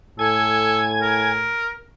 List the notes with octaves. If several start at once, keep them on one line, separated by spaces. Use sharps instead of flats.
A2 A4 G#5 G#6
A#4